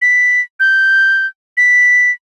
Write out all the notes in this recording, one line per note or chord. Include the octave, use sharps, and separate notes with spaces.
B6
G6
B6